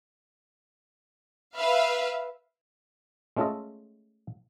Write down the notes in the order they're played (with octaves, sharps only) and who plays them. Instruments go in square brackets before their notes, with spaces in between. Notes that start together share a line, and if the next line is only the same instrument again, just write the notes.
[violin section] B4 E5 F5
[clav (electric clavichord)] G#3 A3 C#4 F4 A4 D#5